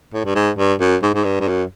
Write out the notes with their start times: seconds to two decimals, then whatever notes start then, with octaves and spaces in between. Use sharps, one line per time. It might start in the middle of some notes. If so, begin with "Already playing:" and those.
0.13 A2
0.25 G2
0.35 G#2
0.58 G2
0.80 F#2
1.03 G#2
1.14 G#2
1.24 G2
1.40 G2
1.48 F#2